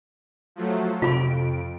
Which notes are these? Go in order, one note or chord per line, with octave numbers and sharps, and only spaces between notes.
F3 F#3 A3
F2 C3 F4 B5 D7